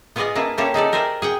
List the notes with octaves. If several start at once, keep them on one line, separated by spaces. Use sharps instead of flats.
B3 F4 G#4 D5 D#5 G#5
A#3 D4 E4 B4
A#3 C#4 E4 F4 G4 A4
D#4 G#4 A4 D5
G4 A#4 C5 D5 E5 G#5
G#4 F#5 G5